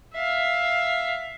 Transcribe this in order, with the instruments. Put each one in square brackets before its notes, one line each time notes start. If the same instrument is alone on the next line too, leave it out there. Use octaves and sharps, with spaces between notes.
[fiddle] E5 F5